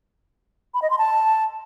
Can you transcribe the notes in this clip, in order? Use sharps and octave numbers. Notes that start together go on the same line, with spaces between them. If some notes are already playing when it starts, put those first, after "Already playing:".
B5
D#5
C6
A5